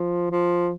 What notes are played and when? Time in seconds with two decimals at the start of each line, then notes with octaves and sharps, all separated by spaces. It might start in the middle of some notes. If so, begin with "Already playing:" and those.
Already playing: F3
0.31 F3